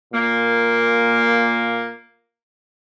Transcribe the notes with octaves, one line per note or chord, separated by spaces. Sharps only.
A#2 A#3